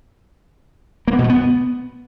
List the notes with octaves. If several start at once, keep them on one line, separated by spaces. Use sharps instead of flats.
A#3
B3
B2
A3
B3